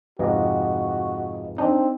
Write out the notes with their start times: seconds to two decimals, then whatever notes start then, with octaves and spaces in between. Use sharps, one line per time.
0.19 F2 G#2 C3 F#4 B4 D#5 F5
1.58 C4 D4 D#4